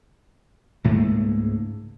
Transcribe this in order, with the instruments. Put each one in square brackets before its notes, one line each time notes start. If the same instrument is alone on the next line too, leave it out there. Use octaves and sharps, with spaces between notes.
[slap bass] C#2 G#2 A3 A#3